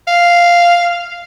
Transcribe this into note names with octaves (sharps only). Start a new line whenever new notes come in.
F5